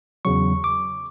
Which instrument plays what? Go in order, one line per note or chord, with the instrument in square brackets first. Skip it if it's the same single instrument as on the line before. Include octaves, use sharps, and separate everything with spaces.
[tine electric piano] E2 C#3 F#3 C#6
D6